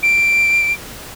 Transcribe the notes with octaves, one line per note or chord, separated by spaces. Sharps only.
D7